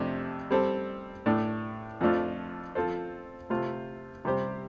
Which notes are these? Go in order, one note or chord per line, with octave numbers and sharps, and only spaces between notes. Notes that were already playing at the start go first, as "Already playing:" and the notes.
Already playing: F2 C3 A3 D4 G4
G3 C4 A4 C5
A2 A3 D4
F2 F3 A3 D4 F4
F3 C4 F4 A4 C5
C3 A3 F4 C5
C3 G3 C4 G4 C5